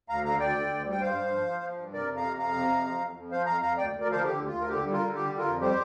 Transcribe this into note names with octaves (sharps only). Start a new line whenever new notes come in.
D2 F5 A#5
D3 F5 A#5
D2 D5 G5
D3
D2
G3
G5
G2 C5 F5
G2
F3
F3
F3
G2
C3 A#4 D5
F2
F5 A#5
C3
F2 F5 A#5
C3
F2
F3
F2
F2
F3 C5 F5
F2 F5 A#5
F2 F5 A#5
D2 D5 G5
D2
A#4 D5
F3 C5 F5
A#4
D3 G4
D2
F4
D2
A#4
D3 G4
G3
F4 A#4
D3
G3 G4
D3
F4 A#4
F2
G3 G4 C5